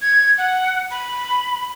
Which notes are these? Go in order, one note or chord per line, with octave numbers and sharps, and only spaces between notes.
G#6
F#5
B5